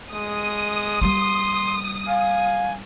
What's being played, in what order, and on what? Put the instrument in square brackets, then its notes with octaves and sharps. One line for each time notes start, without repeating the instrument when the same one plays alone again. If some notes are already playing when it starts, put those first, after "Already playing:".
[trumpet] G#3 [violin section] D#6
[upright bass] G3 A#3 [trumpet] C6
[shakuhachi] F5 [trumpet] G#5